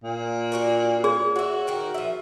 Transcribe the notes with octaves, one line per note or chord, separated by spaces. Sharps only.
A#2
D4 F#4 A#4
G#4 C#5
F#4 C#5 E5
D#3 A#4 G5
F3 E5